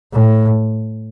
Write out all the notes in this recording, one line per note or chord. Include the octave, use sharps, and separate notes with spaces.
A2